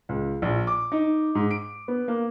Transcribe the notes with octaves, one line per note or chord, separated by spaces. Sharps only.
C#2
A#1
D6
D#4
G#2
D7
B3
A#3